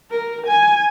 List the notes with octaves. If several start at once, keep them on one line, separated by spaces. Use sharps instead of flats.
A#4
G#5